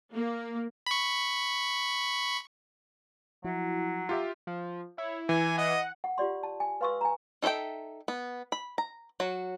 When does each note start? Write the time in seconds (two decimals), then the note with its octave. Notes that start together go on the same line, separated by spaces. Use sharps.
0.14 A#3
0.87 B5 C#6
3.45 F3 F#3 E4 F#4
4.09 F4 G4 E5
4.47 F3
4.98 E4 C#5
5.29 E3 G#5
5.58 D#5 F#5
6.04 F#5
6.18 F4 G4 D5 C6
6.43 A5
6.60 G#5
6.81 B4 F5 C6 C#6 E6
7.01 G#5 A#5
7.42 D#4 A4 C5 E5 G5
8.08 B3
8.52 B5
8.78 A#5
9.20 F#3 F#4